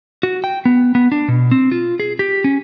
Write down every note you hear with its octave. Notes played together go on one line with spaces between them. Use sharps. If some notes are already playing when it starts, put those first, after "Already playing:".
F#4
G5
B3
B3
D4
B2
C4
F4
G#4
G4
C#4